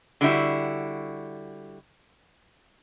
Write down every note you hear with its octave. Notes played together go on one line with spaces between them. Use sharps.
D3 G3 E4 F#4